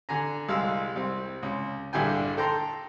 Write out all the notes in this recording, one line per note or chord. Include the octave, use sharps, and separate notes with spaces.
D3 G#5 A#5
C2 G#3 F5 E6
C2 C4
C#2
A#1 G2 D3 E4 G5 G#5
A4 G5 A#5 C6